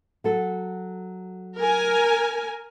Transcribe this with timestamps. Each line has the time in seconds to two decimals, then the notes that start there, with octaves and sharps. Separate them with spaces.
0.24 F#3 F#4 A4
1.58 A#4 G#5